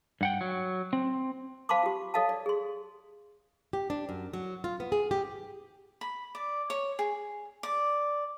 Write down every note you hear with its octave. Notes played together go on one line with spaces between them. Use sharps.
G2 F#5 G5
F#3
C4
C5 F5 A5 B5 C6 D6
F4 G4
A4 C#5 D#5 F5 A5
D5
G#4 C6
G4
D4
F#2
F#3
F4
B3
G#4
G4
B5
D5
C#5
G#4
D5